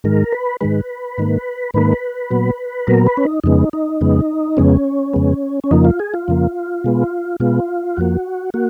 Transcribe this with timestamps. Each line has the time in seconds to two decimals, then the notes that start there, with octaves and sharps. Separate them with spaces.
0.04 G#2 D#3 G#3 A#4
0.32 B4
0.61 G#2 D#3 G#3 B4
1.18 G#2 D#3 A#3
1.74 G#2 D#3 A#3 B4
2.30 A#2 F#3 B3
2.87 A#2 F#3 B3 A#4
3.07 B4
3.17 C#4
3.25 D#4
3.44 F2 C#3 G#3 B3 D#4
3.73 D#4
4.01 F2 C#3 G#3 B3
4.57 F2 C#3 G#3 B3 C#4
5.13 F2 C#3 G#3 B3
5.64 C#4
5.71 F2 C#3 F3 A#3 D#4
5.85 F4
5.99 G#4
6.14 F4
6.28 F2 C#3 F3 A#3
6.84 B2 G#3 B3
7.40 B2 G#3 B3 F4
7.97 F2 F3 A#3 F#4
8.54 A#3 F#4